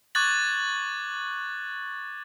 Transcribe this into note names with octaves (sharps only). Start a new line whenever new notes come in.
C#6 D6 F#6 G#6 A6 F#7